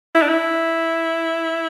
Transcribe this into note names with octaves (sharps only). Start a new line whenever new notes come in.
E4
D4
E4